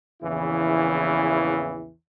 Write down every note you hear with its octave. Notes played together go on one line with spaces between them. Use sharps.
A#1 E2 C#3 E3 E4